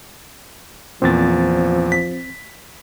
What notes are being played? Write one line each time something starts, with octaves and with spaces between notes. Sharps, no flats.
E2 A#2 F3 C4 A6
B6